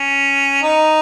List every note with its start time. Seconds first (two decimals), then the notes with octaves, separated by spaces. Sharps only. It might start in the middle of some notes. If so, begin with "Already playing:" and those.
Already playing: C#4
0.63 D#4